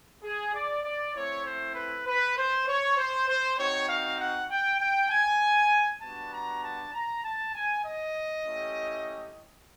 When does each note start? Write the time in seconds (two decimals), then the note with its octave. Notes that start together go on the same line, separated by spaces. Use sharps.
0.23 G#4
0.54 D5
0.84 D5
1.14 A3 C4 E4 C#5
1.45 C5
1.75 B4
2.06 B4
2.36 C5
2.67 C#5
2.97 C5
3.27 C5
3.58 C4 D#4 F#4 C#5
3.89 F5
4.19 F#5
4.50 G5
4.80 G5
5.10 G#5
6.01 G3 B3 D4 F#4 A5
6.32 A#5
6.62 A5
6.92 A#5
7.23 A5
7.54 G#5
7.84 D#5
8.44 A3 C#4 E4 G4